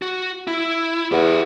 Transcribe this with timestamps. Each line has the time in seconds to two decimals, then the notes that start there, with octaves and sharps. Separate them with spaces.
0.02 F#4
0.47 E4
1.12 E2 G4 F#5